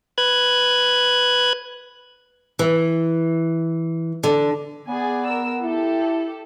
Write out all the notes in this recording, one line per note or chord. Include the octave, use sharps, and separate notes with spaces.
B4 F#6 G#6
E3
D3
B3 G#4 D5 G#5
A#4 E6
E4 G4 A4